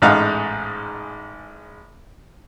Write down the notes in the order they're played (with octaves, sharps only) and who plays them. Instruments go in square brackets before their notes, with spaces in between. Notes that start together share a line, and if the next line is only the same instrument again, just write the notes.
[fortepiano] A1 G#2 G#3 F5 F#5 A#5